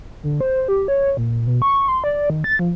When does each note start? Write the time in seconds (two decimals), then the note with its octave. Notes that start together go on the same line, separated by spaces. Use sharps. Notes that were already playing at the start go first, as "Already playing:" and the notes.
0.23 D3
0.41 C5
0.68 G4
0.88 C#5
1.17 A#2
1.47 B2
1.62 C#6
1.88 C6
2.04 D5
2.30 D#3
2.44 A6
2.59 F3